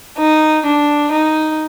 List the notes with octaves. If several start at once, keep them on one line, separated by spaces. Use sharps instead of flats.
D#4
D4
D#4